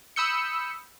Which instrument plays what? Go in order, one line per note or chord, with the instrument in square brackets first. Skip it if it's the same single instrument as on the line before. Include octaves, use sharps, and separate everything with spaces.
[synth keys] B5 D#6 E6 G6 C#7